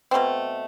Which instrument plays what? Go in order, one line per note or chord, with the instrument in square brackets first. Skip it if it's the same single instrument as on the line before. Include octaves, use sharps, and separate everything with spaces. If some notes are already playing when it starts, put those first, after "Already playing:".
[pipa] B2 A3 C4